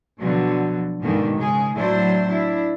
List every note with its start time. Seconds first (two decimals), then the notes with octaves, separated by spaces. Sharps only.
0.18 B2 D3 F3 F#3
1.02 G#2 B2 D3 D#3 A#3
1.36 C#3 G#3 G#4
1.76 A2 F#3 D4 E4 C5
2.28 D4 E4